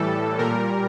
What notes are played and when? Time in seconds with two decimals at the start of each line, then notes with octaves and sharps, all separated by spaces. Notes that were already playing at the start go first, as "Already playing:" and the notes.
Already playing: A2 E3 G3 A4
0.38 A#2 G3 A#4